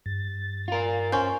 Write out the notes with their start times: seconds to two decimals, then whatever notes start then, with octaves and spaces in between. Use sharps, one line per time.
0.06 G2 A6
0.68 F4 A#4
1.12 C#4 C5